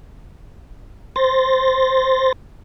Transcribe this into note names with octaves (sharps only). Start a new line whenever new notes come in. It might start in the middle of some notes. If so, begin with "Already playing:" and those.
C5 C6 A6 A#6